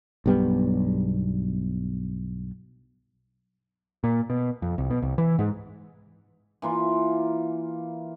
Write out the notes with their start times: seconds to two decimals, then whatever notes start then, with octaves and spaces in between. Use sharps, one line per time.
0.26 B1 G2 G3 B3
4.04 A#2
4.30 B2
4.62 F2
4.78 C2
4.90 B2
5.02 C2
5.18 E3
5.39 G#2
6.62 E3 A#3 F4